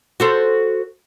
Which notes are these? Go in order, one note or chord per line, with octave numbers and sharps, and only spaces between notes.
F#4 A4 C5